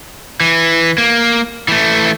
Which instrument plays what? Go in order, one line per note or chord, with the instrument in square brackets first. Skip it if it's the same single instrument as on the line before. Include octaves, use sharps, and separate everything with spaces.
[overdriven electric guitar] E3
A#3
E3 A3